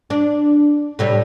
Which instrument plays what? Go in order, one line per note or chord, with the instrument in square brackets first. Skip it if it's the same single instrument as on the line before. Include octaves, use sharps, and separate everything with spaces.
[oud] D4
A2 C3 G3